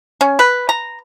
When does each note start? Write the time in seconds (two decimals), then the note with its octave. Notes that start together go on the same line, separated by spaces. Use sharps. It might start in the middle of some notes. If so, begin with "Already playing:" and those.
0.21 C#4
0.39 B4
0.69 A#5